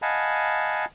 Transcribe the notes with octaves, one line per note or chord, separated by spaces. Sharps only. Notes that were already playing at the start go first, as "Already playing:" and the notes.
D#5 F5 F#5 G#5 A5 B5